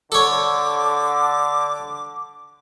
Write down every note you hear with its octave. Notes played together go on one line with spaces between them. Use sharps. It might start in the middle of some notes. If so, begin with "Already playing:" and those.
D3 A4 C#5 D6